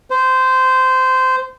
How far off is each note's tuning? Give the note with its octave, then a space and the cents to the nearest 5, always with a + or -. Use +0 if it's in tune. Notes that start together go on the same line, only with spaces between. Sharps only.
C5 -15